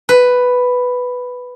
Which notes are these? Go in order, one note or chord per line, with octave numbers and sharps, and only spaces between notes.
B4